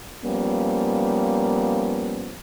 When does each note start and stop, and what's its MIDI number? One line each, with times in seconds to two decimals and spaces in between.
0.24 2.36 53
0.24 2.36 55
0.24 2.36 58
0.24 2.36 59
0.24 2.36 61